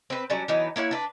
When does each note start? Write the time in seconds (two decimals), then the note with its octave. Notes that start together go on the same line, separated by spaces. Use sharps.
0.10 C4 B4
0.30 F#3 G3 C#4 D4
0.48 E3 F#3 B3 D#4
0.76 A#3 E4 C#5 F#5
0.91 D4 B4